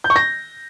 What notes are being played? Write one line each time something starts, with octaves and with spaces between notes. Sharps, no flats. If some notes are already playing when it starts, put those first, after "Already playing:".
G6
C#6
A#6